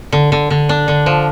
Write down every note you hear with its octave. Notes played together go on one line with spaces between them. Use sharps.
D3
D3
D3
D4
D3
F3